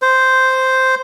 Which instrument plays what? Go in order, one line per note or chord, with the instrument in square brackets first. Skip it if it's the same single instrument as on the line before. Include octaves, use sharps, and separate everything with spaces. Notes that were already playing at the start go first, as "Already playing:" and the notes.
[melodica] C5